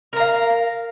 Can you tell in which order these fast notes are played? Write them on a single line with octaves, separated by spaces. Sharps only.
A#4 A#5 F5